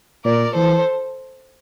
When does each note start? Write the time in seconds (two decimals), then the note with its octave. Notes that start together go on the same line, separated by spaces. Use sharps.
0.25 A#2 A#4 D5
0.55 E3 A4 C5